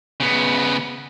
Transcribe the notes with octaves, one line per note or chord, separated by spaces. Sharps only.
C#3 B3